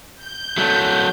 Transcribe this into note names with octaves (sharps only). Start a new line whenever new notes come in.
G6
F#3 A3